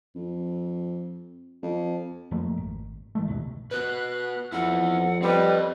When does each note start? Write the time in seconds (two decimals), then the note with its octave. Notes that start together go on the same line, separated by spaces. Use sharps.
0.15 F2
1.63 F2
2.31 F2 F3 A3 A#3
2.57 G#1
3.15 G#1 E3 G#3 A3
3.28 A#1 D#2 G#2 B2
3.71 F#4 B4 F#6
4.53 F2 B3 E4 F#5
5.22 G3 C4 B4 D#5